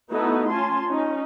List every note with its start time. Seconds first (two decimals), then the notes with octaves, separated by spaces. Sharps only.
0.11 A3 B3 D#4 E4 F#4 A4
0.49 C#4 F4 G#5 A5 C6
0.87 C#4 D#4